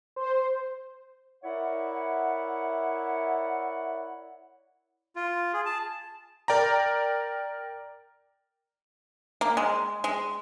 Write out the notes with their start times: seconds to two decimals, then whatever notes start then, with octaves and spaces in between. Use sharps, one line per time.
0.16 C5
1.44 E4 A#4 C#5 D5 E5 F#5
5.16 F4
5.53 G#4
5.66 A5
6.48 A#4 D5 G5 A#5
9.41 A#3
9.57 G#3
10.04 G#3